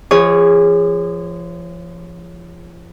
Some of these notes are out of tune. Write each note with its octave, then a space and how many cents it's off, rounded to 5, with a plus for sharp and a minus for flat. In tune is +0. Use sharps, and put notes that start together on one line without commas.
F3 -35 G#4 -20 C#5 +0